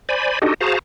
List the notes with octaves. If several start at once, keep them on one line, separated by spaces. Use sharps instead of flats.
C5 D5 G#5 B5
D4 D#4 F#4 G4 A4 D#5
F#4 G#4 C5 F5 A5 A#5